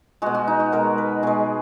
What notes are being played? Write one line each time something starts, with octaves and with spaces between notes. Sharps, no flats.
B2 G#3 F#4
F#4
D#4
F#4
B2 G#3 A#4
B4
B2 G#3 G#4